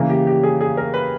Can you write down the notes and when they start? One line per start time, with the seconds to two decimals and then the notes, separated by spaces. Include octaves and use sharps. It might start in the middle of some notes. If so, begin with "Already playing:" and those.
Already playing: C#3 E3 A#3
0.09 G4
0.27 G4
0.43 G#4
0.61 G#4
0.77 A#4
0.94 B4